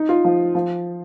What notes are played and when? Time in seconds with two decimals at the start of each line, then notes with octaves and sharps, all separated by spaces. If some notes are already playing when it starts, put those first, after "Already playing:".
Already playing: D#4
0.09 F4
0.25 F3
0.55 F3